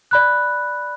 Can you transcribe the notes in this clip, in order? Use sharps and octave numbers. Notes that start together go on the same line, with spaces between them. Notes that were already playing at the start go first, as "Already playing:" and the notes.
D5 B5 F#6